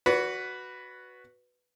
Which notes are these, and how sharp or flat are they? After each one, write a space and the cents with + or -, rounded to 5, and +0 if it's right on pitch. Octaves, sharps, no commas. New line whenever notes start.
F#4 +0 B4 +0 D5 -45